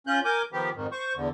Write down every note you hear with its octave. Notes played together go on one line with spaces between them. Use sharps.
C#4 F4 F#6 G6
A#4 G#5 D6 G6
D#3 F3 B3 G4
F2 G#2 D#3
C5 C#6
E2 D3